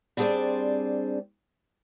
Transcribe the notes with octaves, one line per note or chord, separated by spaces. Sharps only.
G3 C4 D4 G#4 C5 D5